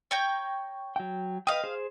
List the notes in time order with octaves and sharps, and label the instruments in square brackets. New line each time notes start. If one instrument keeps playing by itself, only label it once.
[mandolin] C#5 G5 A#5
[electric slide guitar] F#3 G5
[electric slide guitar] B4 D#5 G5 [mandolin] F5 D#6
[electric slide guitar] G#4 C5